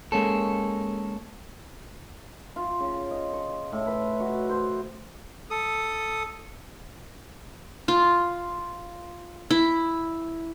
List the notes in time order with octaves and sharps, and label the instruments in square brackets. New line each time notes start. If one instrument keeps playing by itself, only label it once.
[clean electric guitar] G#3 A#3 C#4 A4
[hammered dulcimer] F4
C#3
D#5
C#6
A2
B4
F#4
C5
[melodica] A4 D#6
[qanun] F4
E4